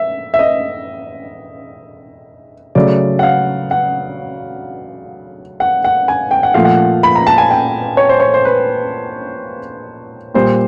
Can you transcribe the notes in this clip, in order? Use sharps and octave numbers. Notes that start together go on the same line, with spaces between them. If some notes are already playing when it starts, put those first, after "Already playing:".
Already playing: E5
E5
D#5
C#3 F#3 A3 D5
F#5
F5
F#5
F#5
F#5
G#5
G5
F#5
A#2 F3 A3 F5
F#5
B5
A#5
A5
G#5
G5
C#5
C5
C#5
C5
B4
A#2 G3 C5